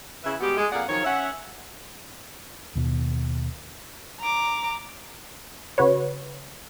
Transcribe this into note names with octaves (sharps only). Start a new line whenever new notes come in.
C#3 E4 B4 E5
G3 G#3 B3 F#4 G4
G#3
F2 A#3 G#4 D5 F5 F#5
D#3 F3 F#3 C#5
C#4 E5 F#5
D#2 B2
A#5 D6
C#3 F#4 B4 C#5